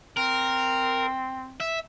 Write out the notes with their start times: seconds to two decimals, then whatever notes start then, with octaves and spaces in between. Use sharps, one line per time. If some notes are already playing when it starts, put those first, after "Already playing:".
0.17 C4 A#4
1.60 E5